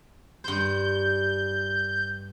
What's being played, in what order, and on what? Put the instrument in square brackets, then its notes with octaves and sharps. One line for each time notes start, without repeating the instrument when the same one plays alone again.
[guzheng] G2 C5 [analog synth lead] G6